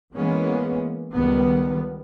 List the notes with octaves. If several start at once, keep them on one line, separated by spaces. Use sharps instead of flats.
E3 G#3 A#3 B3 C#4
C#2 D#3 G3 B3